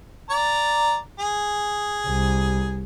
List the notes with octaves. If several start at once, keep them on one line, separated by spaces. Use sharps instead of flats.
D5 A#5
G#4
C2